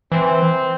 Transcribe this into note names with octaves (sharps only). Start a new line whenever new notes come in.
E3 C4